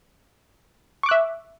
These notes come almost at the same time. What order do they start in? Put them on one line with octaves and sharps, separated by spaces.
C#6 D6 F#6 E5